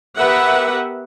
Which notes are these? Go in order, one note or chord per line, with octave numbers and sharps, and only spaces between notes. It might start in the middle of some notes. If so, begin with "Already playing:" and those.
B3 G4 A#4 B4 E5 F#5